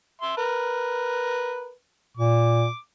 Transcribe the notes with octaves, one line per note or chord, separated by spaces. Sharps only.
E5 C6
A#4 B4
A#2 D6